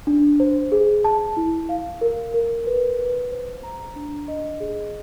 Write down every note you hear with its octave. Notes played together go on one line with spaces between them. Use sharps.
D4
C5
G#4
A5
E4
F5
A#4
A#4
B4
B4
C5
A#5
D4
D#5
G#4